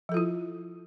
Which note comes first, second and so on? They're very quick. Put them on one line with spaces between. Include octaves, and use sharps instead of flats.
F3 A4 F4 E4